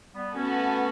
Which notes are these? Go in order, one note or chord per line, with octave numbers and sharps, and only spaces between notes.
G3 B3
A3 B3 C#4 F#4 A4